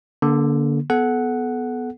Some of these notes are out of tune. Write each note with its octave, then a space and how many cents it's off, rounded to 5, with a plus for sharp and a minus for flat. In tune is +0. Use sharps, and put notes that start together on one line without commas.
D3 -15 A#3 +25
B3 +0 A4 -30 F#5 +0